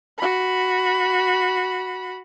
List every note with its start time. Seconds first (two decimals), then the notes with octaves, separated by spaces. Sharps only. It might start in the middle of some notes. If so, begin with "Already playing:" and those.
0.18 F#4 B5